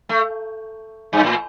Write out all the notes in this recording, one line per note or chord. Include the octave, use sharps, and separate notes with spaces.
A3
G2
A2